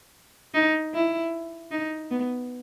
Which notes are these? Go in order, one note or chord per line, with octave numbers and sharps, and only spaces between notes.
D#4
E4
D#4
B3